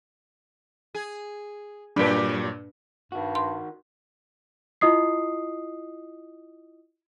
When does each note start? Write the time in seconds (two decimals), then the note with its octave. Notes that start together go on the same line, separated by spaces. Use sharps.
0.95 G#4
1.96 G2 A#2 F#3 D4 G4 B4
3.12 G2 D#3 F#4
3.35 C6
4.81 E4 F4 D#5 D#6 C7